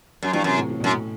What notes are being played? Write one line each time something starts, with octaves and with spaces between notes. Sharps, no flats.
F#2 F#3
G2 E3
F#2 C3
A2
A2
F#2 B2
A2